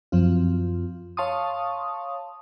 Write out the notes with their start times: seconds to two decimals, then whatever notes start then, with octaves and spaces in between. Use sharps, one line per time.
0.12 F#2 F3 C4 F4
1.17 C#5 F5 A5 C6 C#6 D#6